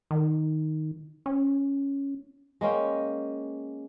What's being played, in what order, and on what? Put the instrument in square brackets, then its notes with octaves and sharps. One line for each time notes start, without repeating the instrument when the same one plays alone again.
[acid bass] D#3
C#4
[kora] G#3 A#3 C#4 G5